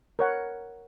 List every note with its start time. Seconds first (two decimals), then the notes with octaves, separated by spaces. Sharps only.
0.19 A#4 C#5 F#5